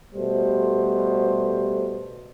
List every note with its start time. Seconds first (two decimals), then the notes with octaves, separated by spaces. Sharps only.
0.15 B2 G3 A3 C5